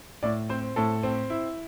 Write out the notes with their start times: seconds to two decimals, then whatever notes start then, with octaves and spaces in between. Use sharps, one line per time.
0.23 A2 D5
0.49 C4 C5
0.76 A2 A4
1.03 C4
1.30 E4